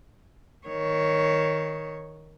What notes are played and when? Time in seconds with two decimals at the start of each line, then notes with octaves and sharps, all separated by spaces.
0.67 D#3 C#5